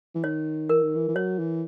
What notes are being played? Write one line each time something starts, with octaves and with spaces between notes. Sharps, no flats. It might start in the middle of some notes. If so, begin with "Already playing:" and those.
E3
D#3 C#5
E3 A#4
D#3
E3
E3
F#3 C#5
E3